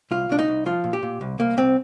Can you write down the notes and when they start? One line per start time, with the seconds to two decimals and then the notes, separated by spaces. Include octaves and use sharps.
0.11 C2 F4
0.29 C2 D4
0.39 D#4
0.48 C2
0.66 F3 F4
0.84 A#2
0.93 G4
1.03 A#2
1.21 C2
1.39 C2 A#3
1.57 C2 C4